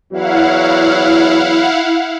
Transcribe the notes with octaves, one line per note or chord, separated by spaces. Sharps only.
E2 F#3 E4 F5 F#5